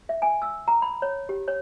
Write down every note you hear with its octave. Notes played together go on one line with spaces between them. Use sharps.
E5
G#5
E6
A#5
B5
C#5
G4
C#5